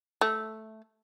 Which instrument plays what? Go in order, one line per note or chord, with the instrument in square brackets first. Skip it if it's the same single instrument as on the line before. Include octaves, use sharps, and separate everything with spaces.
[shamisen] A3